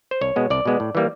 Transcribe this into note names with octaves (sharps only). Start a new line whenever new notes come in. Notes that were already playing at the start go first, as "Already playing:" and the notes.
C5
C2 C#5
B2 G#3 B3
C2 D5
B2 G#3 B3
A2
E3 G3 A#3